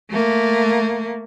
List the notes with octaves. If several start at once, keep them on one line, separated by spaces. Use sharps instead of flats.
A3 A#3